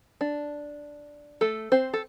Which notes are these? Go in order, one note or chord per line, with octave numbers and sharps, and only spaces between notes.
D4
A3 A4
C4 C5
A4